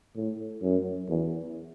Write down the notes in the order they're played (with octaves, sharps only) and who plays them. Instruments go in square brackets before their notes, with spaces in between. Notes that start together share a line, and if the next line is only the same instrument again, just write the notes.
[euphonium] A2
F#2
E2